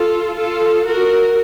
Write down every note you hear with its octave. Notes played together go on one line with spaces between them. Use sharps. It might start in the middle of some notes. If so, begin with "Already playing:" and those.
Already playing: F4 A4
F4 A4
F#4 A#4